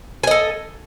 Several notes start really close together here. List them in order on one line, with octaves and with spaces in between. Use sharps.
G#5 D#5 A4